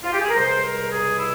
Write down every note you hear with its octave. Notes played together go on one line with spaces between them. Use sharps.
F4
G4
G#4
A#4
C#2 C3 G3 C5
A#4
G#4
E4